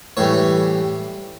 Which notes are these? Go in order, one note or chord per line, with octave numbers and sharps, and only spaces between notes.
A2 E3 G3 C#5